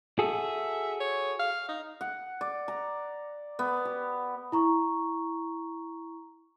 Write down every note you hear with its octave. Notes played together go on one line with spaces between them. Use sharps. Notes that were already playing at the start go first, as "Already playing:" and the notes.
F#4 G#4 A4 E5
C#5
F5
D#4
F#5
D5
A#5
B3
G4
E4 A#5 C#6